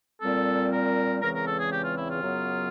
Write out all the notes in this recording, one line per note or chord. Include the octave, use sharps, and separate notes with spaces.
A#2 G3 C4 A4
A#4
E2 C#3 E3 G#3 C4 A#4
A#4
A4
G#4
G4
F4
E4
F4
F#2 C#3 F#3 B3